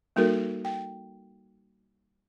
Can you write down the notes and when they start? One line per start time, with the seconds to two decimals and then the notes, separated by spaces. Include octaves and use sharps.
0.16 G3 A#3 D#4 F#4 A4 A#4
0.65 G5